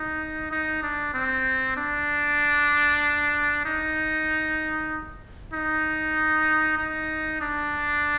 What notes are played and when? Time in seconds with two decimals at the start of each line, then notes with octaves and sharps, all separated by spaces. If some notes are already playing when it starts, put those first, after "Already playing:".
Already playing: D#4
0.52 D#4
0.83 D4
1.14 C4
1.77 D4
3.65 D#4
5.53 D#4
6.78 D#4
7.41 D4